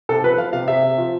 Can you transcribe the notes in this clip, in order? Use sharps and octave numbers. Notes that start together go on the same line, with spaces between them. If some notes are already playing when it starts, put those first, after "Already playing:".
C3 A4
F3 B4
F3 F5
C3 F5
C3 E5
C3
F3